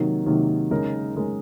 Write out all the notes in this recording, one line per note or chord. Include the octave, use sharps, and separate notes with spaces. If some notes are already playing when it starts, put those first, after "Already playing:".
Already playing: C3 D#3 F#3 A#3 D#4
C3 D#3 F#3 A#3 D#4
C#3 G#3 D#4 A#4
C#3 G#3 D#4 A#4